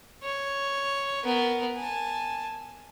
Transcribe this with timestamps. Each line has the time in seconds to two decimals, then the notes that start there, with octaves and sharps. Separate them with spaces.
0.23 C#5
1.24 B3 A#4
1.76 G#5 A5